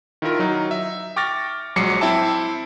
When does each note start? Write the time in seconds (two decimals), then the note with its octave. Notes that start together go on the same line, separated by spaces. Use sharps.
0.22 D#3 E4 F4 A#4
0.39 F#3 D#4
0.71 E5
1.16 G5 C#6 D6 F6 A6 A#6
1.76 A#1 F#3 G#3 D6 C7 C#7
2.01 C4 E4 E5 G5 A5